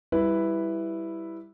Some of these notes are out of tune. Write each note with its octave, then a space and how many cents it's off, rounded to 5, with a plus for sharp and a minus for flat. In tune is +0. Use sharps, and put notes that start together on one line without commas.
G3 +5 E4 +0 B4 +0